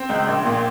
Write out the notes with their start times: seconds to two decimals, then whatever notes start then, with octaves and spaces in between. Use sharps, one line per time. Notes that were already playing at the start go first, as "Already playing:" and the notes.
Already playing: C4
0.09 C#2
0.27 A#1
0.45 A#2